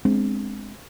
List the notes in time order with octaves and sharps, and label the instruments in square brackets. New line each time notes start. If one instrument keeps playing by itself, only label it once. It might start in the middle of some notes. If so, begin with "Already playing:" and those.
[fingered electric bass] G#3 B3 C4 D4